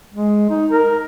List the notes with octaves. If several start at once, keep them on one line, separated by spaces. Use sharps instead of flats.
G#3
D#4
A#4